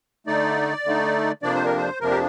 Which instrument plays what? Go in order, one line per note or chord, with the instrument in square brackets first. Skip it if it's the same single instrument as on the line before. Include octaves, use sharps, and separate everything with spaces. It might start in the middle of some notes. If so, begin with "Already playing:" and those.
[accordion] D3 A3 D#4 D5
D3 A3 D#4
F2 C3 F3 A#3 D4 D5
C5
A#4
C5
F2 C3 F3 A#3 D4 A#4
G4